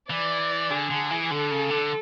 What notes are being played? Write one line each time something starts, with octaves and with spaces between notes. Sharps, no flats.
E3 D5
D3 G#4
D3
E3
D3 A4
C#3
D3